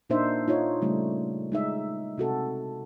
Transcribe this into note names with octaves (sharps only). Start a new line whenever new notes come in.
A#2 A#3 D4 D#4 C5 E5
D#4 F4 C#5
C#3 G3 A3
G#3 D#4 E5
C3 F#4 A4